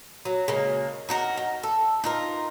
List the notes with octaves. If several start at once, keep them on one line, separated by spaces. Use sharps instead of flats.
F#3
C#3 G#3 A#3
D#4 F#4 A#4
D#4
A4
D#4 F4 A#4